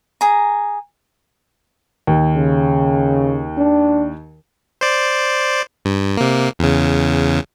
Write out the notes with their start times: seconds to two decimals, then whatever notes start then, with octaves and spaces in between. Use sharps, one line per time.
0.21 G#4 A#5
2.07 D#2
2.36 C#3
3.57 D4
4.81 C5 D5
5.85 G2
6.17 C3 A#3
6.59 E2 C#3